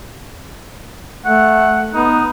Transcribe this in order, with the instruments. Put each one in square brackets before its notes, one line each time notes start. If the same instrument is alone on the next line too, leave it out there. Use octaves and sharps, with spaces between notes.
[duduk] A3 [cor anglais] F#5
[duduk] B3 [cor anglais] D#4